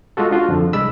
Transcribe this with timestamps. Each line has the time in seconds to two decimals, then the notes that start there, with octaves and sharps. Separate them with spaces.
0.17 G#3 F4 F#4 A4
0.31 D4 F4 F#4
0.49 F2 D3 F3
0.73 C2 G#3 D5 B5 E6